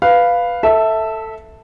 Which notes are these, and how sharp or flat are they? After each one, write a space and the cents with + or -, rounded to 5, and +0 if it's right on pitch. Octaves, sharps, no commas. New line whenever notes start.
B4 +0 F5 +0
A4 +10 E5 -15